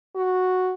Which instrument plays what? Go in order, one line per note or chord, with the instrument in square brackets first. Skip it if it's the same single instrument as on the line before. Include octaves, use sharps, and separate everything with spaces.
[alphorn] F#4